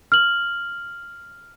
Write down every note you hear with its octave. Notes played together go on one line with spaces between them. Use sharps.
F6 F#7